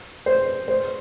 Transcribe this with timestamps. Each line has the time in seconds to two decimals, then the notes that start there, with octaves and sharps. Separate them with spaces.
0.26 C5
0.68 C5